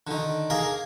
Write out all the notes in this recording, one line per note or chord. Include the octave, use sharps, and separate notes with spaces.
D3 D#3
A#3 G#4 A#4